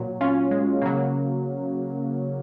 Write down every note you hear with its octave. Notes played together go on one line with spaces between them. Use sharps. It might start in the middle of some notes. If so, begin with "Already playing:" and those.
Already playing: A#2 F#3
C#4 F4
G#3
C#3 F#3 A#3